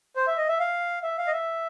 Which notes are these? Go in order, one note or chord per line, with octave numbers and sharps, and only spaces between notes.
C5
E5
D#5
E5
F5
E5
F5
D#5
E5